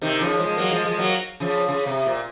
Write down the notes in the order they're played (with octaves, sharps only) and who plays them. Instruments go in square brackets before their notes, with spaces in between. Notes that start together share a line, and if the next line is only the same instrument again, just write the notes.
[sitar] C3 D#3
C#3 F3
F3 G#3
F#3 A#3
F3 G#3
F3 G#3
F#3 A#3
C#3 F3
C#3
C3
A#2